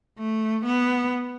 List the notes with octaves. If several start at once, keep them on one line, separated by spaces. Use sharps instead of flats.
A3
B3